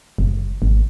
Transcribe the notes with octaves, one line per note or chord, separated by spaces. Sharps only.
F#1
G#1